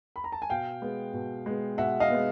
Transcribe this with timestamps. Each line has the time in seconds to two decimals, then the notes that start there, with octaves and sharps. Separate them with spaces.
0.16 B5
0.24 A#5
0.32 A5
0.42 G#5
0.50 B2 F5 G5
0.82 G#3 B3
1.14 B2
1.46 G#3 B3
1.78 B2 E5 F#5
2.00 D#5 F5
2.10 G#3 B3